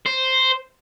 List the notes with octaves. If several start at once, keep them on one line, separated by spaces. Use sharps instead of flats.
C5